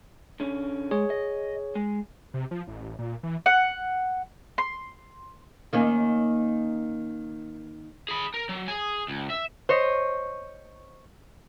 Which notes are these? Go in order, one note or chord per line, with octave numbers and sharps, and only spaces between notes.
D3 C#4
G#3 G#4 C#5
D#5
G#3
C3
F3
A1
A#2
E3
F#5
C6
D#3 A#3 C#4
G#4 B5
A#4
F#3
G#4 G#5
C#2
E5
C5 C#5 D#5